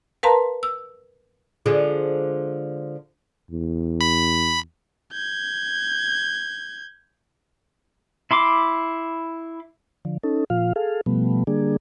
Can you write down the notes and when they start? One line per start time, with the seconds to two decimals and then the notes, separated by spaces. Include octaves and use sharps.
0.23 A#4 B4 F5 A5 A#5 C6
0.63 E6
1.66 D3 F3 G#3
3.51 E2
4.01 B5
5.13 G6 G#6
8.31 E4 B5 C6 D6
10.05 D3 F3
10.23 C#4 D#4 A4
10.50 A#2 F3 F4 F5
10.76 G#4 A4 F5
11.06 B2 F3 G3 A3 B3
11.47 D3 G3 A#3 D4 G#4